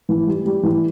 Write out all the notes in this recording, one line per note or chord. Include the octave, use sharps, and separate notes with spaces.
E3
G3
G3
E3